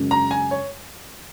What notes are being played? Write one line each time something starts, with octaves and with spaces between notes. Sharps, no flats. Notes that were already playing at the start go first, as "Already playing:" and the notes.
Already playing: F#2 C#3 G#3
A#5
G#5
C#5